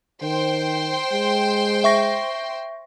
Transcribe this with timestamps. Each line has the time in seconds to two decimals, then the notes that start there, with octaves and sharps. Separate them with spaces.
0.23 D#3 C5 G5 C6
1.12 G#3
1.84 E5 C#6 A#6